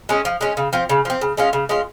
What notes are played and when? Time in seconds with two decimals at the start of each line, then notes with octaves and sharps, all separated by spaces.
0.09 G#3 C#4
0.25 F3
0.41 G#3 C#4
0.57 C#3
0.73 F3 C4
0.89 C#3
1.05 F3 C4
1.21 C#3
1.37 G#3 C#4 F4
1.53 C#3
1.69 G#3 C#4 F4